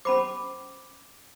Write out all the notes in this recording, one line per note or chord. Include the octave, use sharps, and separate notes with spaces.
C#4 C5 B5 D6